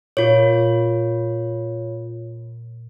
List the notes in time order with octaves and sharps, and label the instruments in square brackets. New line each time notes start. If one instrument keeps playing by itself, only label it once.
[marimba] A#2 [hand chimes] F4 C#5